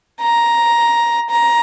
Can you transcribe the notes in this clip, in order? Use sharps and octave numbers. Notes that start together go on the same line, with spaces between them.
A#5
A#5